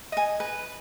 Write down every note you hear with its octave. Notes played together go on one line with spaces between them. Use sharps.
D#5 G#5
B4